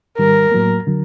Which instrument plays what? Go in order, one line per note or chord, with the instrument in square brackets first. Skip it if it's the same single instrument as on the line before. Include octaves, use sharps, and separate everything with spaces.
[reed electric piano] G#2 D#3 G3 [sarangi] A#4
[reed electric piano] A2 F#3 A#3
D3 F#3